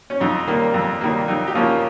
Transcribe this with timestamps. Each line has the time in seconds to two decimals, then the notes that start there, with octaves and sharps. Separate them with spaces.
0.10 C#4
0.20 F2 D#4
0.47 D#3 G3 A#3
0.74 F2
1.01 D#3 G3 A#3
1.28 F2 D#4
1.47 G4
1.55 C#3 F3 A#3 F4